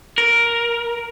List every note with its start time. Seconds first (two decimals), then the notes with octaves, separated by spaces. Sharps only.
0.18 A#4